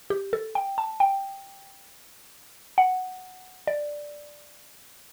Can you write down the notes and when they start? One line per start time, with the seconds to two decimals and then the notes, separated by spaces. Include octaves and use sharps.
0.10 G4
0.33 A4
0.55 G5
0.78 A5
1.00 G5
2.78 F#5
3.67 D5